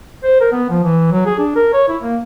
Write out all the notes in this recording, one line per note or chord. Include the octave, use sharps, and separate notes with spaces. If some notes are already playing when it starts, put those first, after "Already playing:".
C5
A#4
B3
F3
E3
F#3
G#4
D4
A#4
C#5
E4
A#3